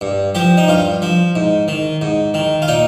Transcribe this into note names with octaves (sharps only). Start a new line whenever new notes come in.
G2
F3 G4
D#4
G2 F4
F3
G#2
D#3
G#2
D#3
F4
A#2 D#4